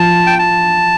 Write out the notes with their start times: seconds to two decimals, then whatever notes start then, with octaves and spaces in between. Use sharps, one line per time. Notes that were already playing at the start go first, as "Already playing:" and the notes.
Already playing: F3 A5
0.26 G5
0.39 A5